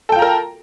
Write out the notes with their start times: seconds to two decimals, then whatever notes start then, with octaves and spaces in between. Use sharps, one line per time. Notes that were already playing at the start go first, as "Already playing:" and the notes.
0.09 A4
0.12 G5
0.16 F4
0.19 A#5
0.22 A#4